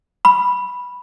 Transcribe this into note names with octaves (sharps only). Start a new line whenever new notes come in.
B5